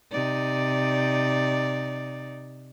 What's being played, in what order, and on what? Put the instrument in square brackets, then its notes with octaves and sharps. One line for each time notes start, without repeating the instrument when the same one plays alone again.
[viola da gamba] C3 D#4 D5